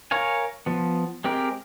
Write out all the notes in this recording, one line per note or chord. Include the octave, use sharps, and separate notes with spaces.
A#4 C#5 F5 G#5
F3 B3
G#3 C4 G4 A#4